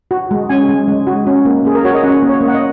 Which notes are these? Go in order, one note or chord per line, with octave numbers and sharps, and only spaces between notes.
F#4
G#3
C#4 G#5
G#3
G#3
F#4
C#4
A#3
A#3 G#4
A#4
F#4 C#5
D#5
C#4 F#5
A#3
C#5
A#3
F#5
D#5